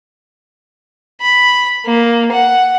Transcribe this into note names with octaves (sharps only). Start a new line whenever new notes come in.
B5
A#3
F#5